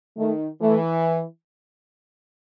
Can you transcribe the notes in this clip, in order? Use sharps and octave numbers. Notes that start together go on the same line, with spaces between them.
D#3 A3
E3 A3